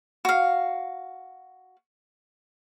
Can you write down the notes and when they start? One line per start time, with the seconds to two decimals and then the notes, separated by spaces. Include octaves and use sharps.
0.25 F#4 F5